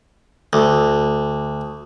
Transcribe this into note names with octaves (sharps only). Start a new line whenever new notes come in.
D2